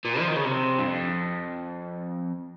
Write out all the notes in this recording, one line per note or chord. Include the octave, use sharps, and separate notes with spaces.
A#2
F3
D#3
C#3
C3
G2
F2